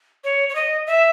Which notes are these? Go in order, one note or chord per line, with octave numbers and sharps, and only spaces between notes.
C#5
C#5
D#5
E5